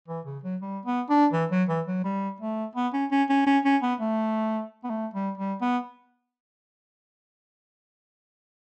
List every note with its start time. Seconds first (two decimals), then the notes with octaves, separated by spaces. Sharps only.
0.08 E3
0.26 C#3
0.43 F#3
0.62 G3
0.85 B3
1.09 D4
1.33 E3
1.51 F#3
1.69 E3
1.87 F#3
2.04 G3
2.40 A3
2.76 B3
2.94 C#4
3.11 C#4
3.29 C#4
3.47 C#4
3.65 C#4
3.83 B3
4.01 A3
4.84 B3
4.90 A3
5.14 G3
5.38 G3
5.62 B3